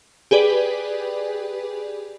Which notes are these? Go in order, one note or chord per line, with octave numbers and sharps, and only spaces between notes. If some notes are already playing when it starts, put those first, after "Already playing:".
G4 G#4 B4 D5